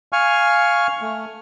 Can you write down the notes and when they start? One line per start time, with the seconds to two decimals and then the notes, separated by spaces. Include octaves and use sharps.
0.13 F5 G#5 C#6 F6
1.01 A3